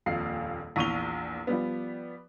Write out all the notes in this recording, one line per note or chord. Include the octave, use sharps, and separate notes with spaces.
D#1 A#1 F2 F5 C7
A#1 E2 C#6 D#7 F7 G7
F3 G3 B3